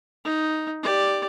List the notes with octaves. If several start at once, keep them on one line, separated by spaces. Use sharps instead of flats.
D#4
G4 D5